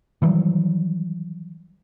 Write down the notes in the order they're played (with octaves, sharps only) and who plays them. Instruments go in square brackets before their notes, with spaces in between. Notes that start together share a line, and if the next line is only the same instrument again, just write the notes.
[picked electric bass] D#3 E3 F#3 G3